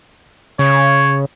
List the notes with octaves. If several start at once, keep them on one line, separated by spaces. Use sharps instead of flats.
C#3 C#5